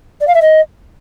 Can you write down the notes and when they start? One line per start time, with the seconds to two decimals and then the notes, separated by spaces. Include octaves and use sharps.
0.20 D5
0.27 F5
0.34 E5
0.41 D#5